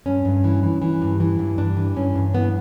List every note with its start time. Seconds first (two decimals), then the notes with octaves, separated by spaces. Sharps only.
0.06 G2 C#4
0.25 G2
0.44 E3
0.63 E3
0.82 E3
1.02 G2
1.20 E3
1.39 G2
1.58 G2 D4
1.77 E3
1.96 G2 C#4
2.16 G2
2.34 E3 B3